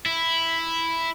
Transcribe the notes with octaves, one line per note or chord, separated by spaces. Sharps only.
E4